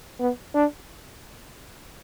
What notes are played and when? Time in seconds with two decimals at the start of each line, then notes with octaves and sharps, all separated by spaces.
0.20 B3
0.54 D4